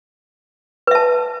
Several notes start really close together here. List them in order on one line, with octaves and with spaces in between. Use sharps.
B4 E5 A5